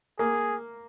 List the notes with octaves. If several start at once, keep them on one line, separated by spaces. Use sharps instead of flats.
A#3 G#4